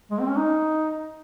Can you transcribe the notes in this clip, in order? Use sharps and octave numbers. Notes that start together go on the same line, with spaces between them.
G#3
C4
C#4
D#4